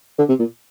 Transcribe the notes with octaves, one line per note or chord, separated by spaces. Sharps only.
D3
C3
A#2